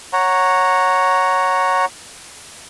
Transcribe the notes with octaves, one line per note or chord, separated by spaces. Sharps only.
C#5 F#5 A#5